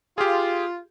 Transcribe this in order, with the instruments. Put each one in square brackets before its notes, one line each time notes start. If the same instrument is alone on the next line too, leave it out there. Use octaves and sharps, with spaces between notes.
[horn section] F4 [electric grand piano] G4 G#4